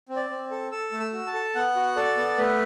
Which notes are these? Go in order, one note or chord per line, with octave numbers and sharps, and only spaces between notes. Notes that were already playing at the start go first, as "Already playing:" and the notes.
C4
D5
C4
A4
A4 E6
A3
E6
F#4
A5
A4
B3 F#5
F#4
A4 D5
B3
A3 B4